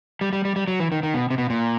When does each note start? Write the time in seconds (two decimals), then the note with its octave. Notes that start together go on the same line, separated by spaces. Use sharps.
0.21 G3
0.33 G3
0.45 G3
0.56 G3
0.68 F#3
0.80 E3
0.92 D#3
1.03 D#3
1.14 B2
1.30 C3
1.38 B2
1.50 A#2